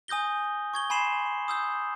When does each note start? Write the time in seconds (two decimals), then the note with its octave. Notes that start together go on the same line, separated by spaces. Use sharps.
0.08 G#5 D#6 G6 A#6 G7
0.74 C#6 G#6 G7
0.90 G#5 B5 C6 C7 E7 F#7
1.48 D#6 E6 G6